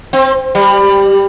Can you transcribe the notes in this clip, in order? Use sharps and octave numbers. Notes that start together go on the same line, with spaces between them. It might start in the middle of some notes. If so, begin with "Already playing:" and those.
C4
G3